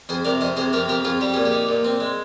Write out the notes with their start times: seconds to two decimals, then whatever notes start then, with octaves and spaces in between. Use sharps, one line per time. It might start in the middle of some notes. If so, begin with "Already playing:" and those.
0.09 F2 G#4 C5
0.24 C3 A#4 D5
0.41 F2 C5 D#5
0.57 C3 G#4 C5
0.73 F2 G4 A#4
0.88 F2 G4 A#4
1.05 F2 F4 G#4
1.21 G3 G4
1.34 A#2 G#4
1.45 G4
1.53 D#4
1.69 A#2
1.85 C4
2.00 G#3